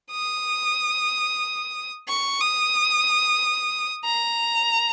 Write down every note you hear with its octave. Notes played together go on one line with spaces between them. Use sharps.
D#6
C#6
D#6
A#5